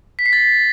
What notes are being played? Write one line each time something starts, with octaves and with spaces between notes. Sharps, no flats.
B6
C7
A6